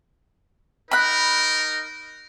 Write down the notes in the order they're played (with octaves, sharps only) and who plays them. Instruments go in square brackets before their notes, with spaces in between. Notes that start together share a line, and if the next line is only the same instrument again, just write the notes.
[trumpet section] D#4 A#4 [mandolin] B5 F#6